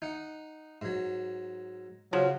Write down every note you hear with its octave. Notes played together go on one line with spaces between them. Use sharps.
D#4 F#5
G#2 F#3
C#3 F3 F#3